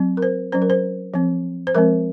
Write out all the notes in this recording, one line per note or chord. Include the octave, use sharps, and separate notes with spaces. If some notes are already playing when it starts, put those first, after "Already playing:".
Already playing: F#3 C4
A#4
C5
F#3 C#4 C5
A#4
C5
F3 C4
C5
F3 G#3 C4 A#4